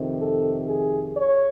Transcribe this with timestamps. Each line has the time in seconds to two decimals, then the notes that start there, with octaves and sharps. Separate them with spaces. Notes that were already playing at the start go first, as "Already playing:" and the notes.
Already playing: F2 C3 D#3
0.18 A4
0.66 G#4
1.15 C#5